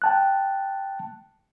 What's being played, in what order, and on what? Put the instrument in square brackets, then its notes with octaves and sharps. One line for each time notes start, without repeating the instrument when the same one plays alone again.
[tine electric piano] G5 A5 F#6